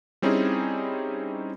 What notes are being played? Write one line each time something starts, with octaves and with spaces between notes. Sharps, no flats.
G3 C4 C#4 D#4 E4 G#4